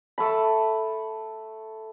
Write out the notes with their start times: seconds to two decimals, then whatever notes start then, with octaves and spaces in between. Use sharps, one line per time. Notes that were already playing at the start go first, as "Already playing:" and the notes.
0.18 A3 A5 B5